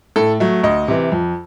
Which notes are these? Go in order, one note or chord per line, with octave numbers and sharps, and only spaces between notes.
A2 A4
F#3 A3
D2 D#5
C3 E3
F2